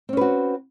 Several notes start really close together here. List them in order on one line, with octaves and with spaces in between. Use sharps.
C4 C#4 B4 F#4